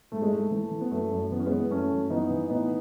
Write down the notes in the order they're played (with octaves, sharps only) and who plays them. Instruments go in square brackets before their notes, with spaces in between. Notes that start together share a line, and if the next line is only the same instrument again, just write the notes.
[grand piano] G#2 A3
G#3
G#2 A3
E3 A3
E3
B3
F#2 A3
F#2
E3 B3
C#4
G#3 B3
E3
F#2 A3 C#4
F#2
E3 B3 D#4
E3
A2 B3 D#4